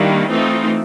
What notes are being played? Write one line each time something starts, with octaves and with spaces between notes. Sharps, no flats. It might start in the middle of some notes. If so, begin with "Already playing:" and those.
Already playing: D#3 G3 A#3 D4 E4
E3 A3 C4 D#4 F4